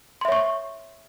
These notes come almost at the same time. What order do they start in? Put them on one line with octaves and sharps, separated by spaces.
C6 E5 C#5 C#6